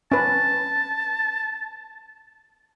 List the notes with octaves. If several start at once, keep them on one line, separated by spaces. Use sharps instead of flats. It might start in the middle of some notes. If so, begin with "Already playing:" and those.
C#4 B4 A5